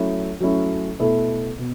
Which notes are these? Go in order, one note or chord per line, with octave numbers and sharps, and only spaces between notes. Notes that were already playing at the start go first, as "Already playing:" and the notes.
Already playing: F#3 A3 C#4 E4
F#3 A3 C#4 E4
B2 A3 E4 A4
B2